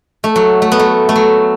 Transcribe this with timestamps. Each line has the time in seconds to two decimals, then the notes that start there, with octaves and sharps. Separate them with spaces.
0.24 A3
0.36 F#3
0.62 A3
0.72 B3
0.79 A3
1.09 A3
1.16 F#3